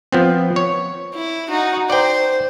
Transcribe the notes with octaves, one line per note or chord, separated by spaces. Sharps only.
F3 B3 C4
C#5
E4
D#4 F#4
C5 D5 G5